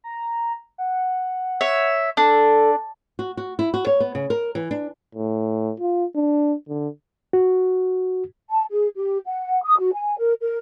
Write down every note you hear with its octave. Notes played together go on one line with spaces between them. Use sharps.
A#5
F#5
C#5 E5
D4 A4
F#4
F#4
E4
F#4
C#5
B3
C#3
A#4
E3
D4
A2
F4
D4
D3
F#4
A5
G#4
G4
F#5
D#6
F#4
G#5
A#4
A#4